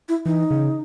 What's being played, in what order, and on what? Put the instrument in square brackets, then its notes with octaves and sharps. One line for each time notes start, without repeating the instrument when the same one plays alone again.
[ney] E4
[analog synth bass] E3 [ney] D#4
[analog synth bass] C#3